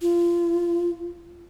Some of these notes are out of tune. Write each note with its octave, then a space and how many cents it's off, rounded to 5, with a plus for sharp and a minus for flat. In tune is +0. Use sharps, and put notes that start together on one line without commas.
F4 -25